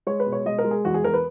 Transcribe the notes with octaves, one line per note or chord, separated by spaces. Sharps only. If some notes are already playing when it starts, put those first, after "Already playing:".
G#3 C#5
B4
B2
C#5
G#3 D#5
A#4
G#3
G#4
E2 F#4
G#4
E2 A#4
B4